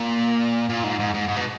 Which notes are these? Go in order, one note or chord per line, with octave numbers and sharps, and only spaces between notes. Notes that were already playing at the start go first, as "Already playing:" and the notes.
Already playing: A#2
A#2
G#2
G#2
G#2
G#2
B2